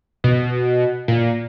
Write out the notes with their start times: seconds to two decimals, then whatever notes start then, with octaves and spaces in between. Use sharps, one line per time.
0.24 B2
1.08 A#2